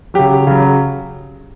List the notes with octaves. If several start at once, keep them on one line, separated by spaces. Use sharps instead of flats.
C#3 F#3 G4
C#3 F#3